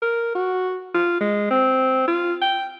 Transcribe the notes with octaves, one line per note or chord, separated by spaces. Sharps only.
A#4
F#4
F4
G#3
C4
F4
G5